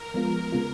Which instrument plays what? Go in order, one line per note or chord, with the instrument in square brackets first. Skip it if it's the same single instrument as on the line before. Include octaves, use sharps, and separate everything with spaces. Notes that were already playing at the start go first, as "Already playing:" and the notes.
Already playing: [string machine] A#4
[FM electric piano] F3 G#3 B3 F4
C#3 G#3 B3 F4